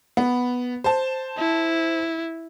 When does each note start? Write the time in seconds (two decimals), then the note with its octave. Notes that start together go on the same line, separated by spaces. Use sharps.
0.17 B3
0.84 C5 A5
1.38 E4